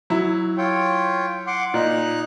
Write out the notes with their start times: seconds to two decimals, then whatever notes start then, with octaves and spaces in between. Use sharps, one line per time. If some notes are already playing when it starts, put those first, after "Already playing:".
0.10 F#3 E4
0.58 F4 C#5 G5
1.47 F#5 C6 D6
1.74 A#2 D#4 F#6